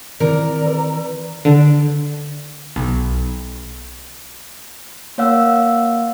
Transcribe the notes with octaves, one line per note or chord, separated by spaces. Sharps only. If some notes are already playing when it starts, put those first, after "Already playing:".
D#3 E3 C4 A#4 D5
B4
D3
B1
A#3 C#5 F5 F#5 E6